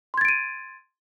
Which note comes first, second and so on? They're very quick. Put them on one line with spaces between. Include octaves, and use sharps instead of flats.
C6 G#6 A6 D7 D#7